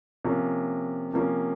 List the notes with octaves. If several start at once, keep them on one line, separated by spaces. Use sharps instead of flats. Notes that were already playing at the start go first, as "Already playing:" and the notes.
C3 F3 A#3 C#4
C3 F3 A#3 C#4